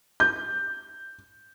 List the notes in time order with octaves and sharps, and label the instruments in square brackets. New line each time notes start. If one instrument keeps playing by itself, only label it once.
[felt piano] G6